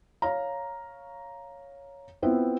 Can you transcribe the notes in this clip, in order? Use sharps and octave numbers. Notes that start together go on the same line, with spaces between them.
C#5 F5 A#5
B3 C4 E4 F4 B4 C5